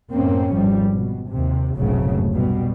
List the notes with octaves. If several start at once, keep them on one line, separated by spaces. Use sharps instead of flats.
F#2 A2 A#3 C4 C#4
G#1 F2 F3 G3
B2
D#2 C3
F1 B1 G#2 C#3 F#3 A3
B2 G3